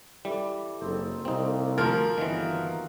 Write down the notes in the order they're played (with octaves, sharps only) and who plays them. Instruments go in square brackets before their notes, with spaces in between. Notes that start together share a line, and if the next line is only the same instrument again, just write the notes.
[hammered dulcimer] E3 A4 D5 [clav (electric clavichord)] G3
[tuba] F#1 [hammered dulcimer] C4 D#4 A4
[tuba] C2 [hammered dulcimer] A#3 [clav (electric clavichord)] C4 D#4
[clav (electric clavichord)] D2 F4 [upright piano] F3 A#4
[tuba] G1 [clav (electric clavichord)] D#3 E3 [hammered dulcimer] F4 F#4 G#4